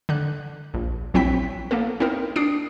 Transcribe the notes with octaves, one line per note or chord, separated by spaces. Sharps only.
D3 F#6
A#1
A#1 F#3 C4 E4 G5 B6
A#3 B3 A4
C4 D#4 E4 A#4
D4 D#6 C7 D7